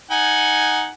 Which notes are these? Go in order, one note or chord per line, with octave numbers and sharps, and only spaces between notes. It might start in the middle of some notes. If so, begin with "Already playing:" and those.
D#4 F#5 G#5